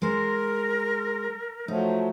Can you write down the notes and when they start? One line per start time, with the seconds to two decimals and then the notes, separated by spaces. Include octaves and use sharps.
0.02 G#3 A#4 C5
1.68 F3 F#3 A3 D#4